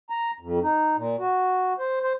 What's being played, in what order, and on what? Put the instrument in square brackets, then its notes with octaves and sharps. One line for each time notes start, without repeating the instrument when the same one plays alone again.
[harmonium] A#5
F2
D#4
A#2
F#4
C5
C5